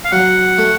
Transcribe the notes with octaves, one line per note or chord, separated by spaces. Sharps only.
F5
F#3 F#5
A3